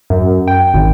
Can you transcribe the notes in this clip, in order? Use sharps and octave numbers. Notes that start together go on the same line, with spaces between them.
F#2
G5
G#1